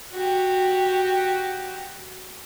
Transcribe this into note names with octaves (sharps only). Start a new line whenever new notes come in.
F#4 G4